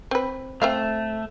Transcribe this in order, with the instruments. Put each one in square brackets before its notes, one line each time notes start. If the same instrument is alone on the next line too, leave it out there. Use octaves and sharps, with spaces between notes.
[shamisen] C4 B4
[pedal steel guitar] A3 [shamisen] C4 E5 F5